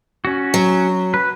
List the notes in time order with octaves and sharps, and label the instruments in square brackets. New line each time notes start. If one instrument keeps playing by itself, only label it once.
[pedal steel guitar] C#4 F#4
[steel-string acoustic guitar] F#3
[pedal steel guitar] B4